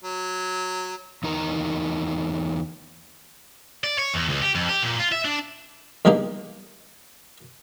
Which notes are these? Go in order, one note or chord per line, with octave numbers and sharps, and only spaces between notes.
F#3
E2 D#4 A#4 A#5
D5
C#5
E2
C#2
G4
F2
G4
A#2
F4
E5
D4
E2 D3 G3 A#3 D#4